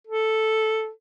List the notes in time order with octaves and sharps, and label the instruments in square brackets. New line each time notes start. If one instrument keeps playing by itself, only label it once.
[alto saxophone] A4